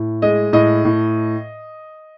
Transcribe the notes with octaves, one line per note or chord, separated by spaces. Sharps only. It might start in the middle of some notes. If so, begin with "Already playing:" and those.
Already playing: A2
G#3 D#5
A2 D#5
A2